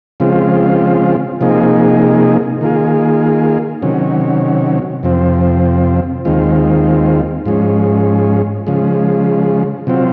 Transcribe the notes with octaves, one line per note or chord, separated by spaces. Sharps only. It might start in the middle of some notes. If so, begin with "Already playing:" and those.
C#3 F3 G#3 C4 F4
C3 F3 A#3 D#4 G#4
D#3 A#3 F4 G#4
C3 D#3 F#3 C#4
F2 C3 F3 C4
D#2 D#3 G#3 C4 F4
G#2 F3 G#3 C#4
C#3 F3 G#3
C3 F#3 C4 F4